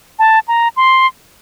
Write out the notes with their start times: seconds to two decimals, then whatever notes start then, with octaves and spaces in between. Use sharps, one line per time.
0.19 A5
0.48 A#5
0.77 C6